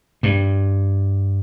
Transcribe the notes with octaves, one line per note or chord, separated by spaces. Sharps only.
G2